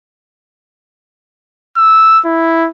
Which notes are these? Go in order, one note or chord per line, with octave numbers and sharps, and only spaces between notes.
E6
E4